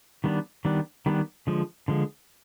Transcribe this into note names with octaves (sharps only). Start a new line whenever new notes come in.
D#3 G3 B3 D4
D#3 G3 B3 D4
D#3 G3 B3 D4
D3 F3 G#3
D3 F3 G#3